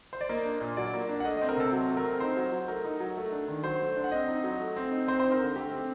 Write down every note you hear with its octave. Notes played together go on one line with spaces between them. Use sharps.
C5
D5
A#3 D#5
D4
A#2
F#3 D5
A#3
D4
F#5
A3 D#5
D#5
C4
A#4
C3 A4
F#3
A3
A#4
C4
D#4 C5
F#3
F#3
A3 A#4
D#4
F#3
A3
D4
D#3
F#3 C5
A3
D4
F#5
C4 D#5
D#4
F#3
A3
C4
D#4
C4 C5
C5
D#4
A#4
D3
A3 G4
C4